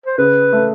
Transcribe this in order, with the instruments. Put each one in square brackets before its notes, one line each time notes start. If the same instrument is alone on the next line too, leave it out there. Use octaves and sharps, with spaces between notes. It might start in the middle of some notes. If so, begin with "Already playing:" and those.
[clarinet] C5
[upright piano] C#3 [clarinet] B4
[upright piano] A3